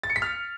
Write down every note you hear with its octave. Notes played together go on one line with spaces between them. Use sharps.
A6
C#7
B6
F6